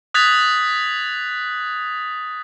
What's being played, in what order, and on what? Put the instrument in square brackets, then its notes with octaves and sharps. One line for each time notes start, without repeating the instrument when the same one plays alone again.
[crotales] D#6 F#6 G#6 A6 B6 F7